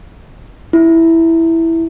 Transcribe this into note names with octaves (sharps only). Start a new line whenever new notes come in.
E4